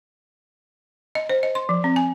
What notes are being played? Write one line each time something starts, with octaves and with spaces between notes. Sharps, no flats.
D#5
C5
D#5
C6
F3
C4
G#5